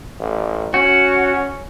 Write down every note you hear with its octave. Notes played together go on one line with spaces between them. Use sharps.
A1
C#4 F#4